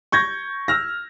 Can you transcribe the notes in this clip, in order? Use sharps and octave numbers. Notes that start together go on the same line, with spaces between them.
C#6 G6 G#6 A#6
E6 F6 A#6